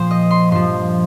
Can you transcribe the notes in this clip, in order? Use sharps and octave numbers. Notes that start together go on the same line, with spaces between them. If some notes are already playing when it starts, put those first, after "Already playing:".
Already playing: A#2 F3 C5
D#5
C6
G2 F3 C6